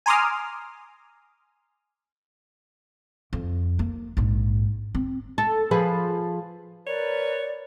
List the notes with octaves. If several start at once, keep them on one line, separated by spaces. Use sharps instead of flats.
G#5 A#5 C6 D6 D#6 F6
F2
A#3
A#1 G#2
C4
A4
F3 G#4 B4
A#4 B4 C#5 D5